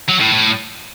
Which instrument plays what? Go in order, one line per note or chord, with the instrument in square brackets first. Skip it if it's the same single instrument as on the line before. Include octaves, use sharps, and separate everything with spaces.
[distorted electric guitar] F#3
A2
A2